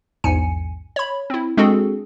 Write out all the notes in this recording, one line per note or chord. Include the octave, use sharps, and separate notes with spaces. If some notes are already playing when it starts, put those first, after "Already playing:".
A#1 E2 G#2 G#5 C#7
C#5 B5
C4 E4
G#3 C4 D4 F#4 G#4 A4